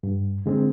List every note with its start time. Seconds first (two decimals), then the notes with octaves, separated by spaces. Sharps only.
0.03 G2
0.46 D3 G#3 C4